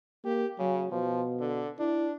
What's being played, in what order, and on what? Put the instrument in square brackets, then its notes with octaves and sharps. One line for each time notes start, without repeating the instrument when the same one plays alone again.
[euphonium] A#3 [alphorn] G4
[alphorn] C#3 [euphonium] F#3
[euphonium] B2 [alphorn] F3
[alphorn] D3
[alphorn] D4 [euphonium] E4